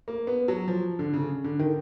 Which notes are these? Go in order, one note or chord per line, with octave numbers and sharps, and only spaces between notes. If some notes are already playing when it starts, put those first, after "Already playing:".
A#3
B3
F#3
F3
D3
C#3
D3
D#3